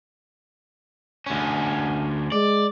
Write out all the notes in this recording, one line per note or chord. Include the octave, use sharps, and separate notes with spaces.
D2 C#4
G#3 D5